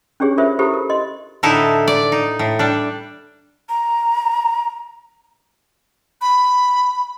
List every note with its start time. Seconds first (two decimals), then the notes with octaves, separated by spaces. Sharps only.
0.20 C#4 D4 G4 G#4 C#5
0.38 F4 A#4 C5 C#5 E5
0.59 E4 G4 A4 C5 B5
0.74 A#4
0.90 D#5 C6
1.43 A2 D3 D#4 E4 A5
1.88 D5
2.12 D#4
2.39 A2
2.59 G3 D4
3.69 A#5
6.21 B5